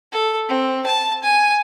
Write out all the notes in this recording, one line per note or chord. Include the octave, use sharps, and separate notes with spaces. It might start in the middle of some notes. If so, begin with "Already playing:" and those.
A4
C4
A5
G#5